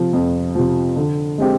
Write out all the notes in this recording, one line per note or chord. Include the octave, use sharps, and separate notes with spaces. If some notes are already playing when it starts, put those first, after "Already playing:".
Already playing: C3 F3
F2
C3 F3
D3
G#3 C4 G4